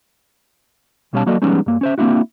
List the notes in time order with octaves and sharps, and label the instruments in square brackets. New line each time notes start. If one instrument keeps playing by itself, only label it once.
[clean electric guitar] B1 B2 G3 C#4 F5 A5
F#3 A#3 F#4 A4 D5 D#5
F3 G3 G#3 B3 C#4 D#4
G2 A#3
C#4 C5 E5
A#3 C4 D4 E4 F#4